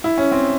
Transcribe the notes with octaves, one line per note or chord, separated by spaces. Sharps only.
E4
C#4
C4